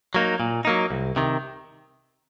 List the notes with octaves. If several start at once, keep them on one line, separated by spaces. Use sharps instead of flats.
F#3 A#3 D#4
A#2
F#3 A#3 D#4
C2
C3 D#3